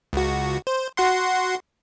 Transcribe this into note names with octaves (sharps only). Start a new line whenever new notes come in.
C#2 F#4
C5
F#4 F#5 C6